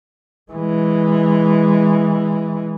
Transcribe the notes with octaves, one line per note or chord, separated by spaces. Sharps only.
E3 G#3